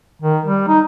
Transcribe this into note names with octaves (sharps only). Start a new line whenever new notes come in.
D#3
G3
D#4